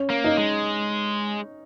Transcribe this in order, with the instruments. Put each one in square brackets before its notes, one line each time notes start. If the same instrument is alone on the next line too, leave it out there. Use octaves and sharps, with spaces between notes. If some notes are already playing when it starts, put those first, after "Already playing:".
Already playing: [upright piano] C#4
[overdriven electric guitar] A#3
[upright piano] D#4
[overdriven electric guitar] G#3